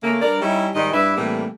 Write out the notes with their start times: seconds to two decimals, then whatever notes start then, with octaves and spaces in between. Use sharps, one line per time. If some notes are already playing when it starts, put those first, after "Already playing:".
0.02 C#3 A3 A#3
0.20 G2 A#4 D5
0.41 G3 C#4 D#4 E4
0.74 G#2 D#3 G3 G#3 D#5
0.92 G2 E4 B4 D5 E5
1.16 A2 C3 E3 G3 A3 A#3